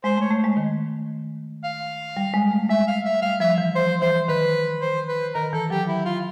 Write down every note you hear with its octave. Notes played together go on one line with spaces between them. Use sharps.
G#3 C5
A3 C#5
A3
G#3
D#3
F5
G3
G#3
A3
G#3 E5
F5
E5
G3 F5
F3 E5
E3
F3 C5
E3 C5
D#3 B4
C5
B4
D#3 A#4
E3 A4
F#3 G4
E4
F4